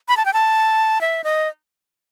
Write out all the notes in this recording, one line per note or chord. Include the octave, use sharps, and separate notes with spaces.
B5
A5
G5
A5
E5
D#5